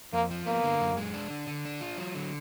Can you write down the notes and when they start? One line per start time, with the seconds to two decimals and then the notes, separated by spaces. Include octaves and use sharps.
0.13 F2 A#3
0.31 F3
0.46 A#3 B3
0.64 D3
0.81 F#2
0.97 G#3
1.14 D4
1.30 D3
1.47 D3
1.65 D4
1.81 F4
1.98 F#3
2.15 D3